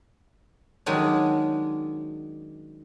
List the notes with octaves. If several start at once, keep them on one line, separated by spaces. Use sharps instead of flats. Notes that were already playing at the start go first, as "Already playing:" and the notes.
D#3 F#3 G#3 C#4 D4